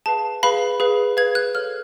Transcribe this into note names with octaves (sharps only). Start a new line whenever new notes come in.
G#4 B4 F5 A5
G#4 B4 F5 B5
G#4 B4 F5
G#4 B4 F5 G#6
F#6
A4 C#5 F5 F6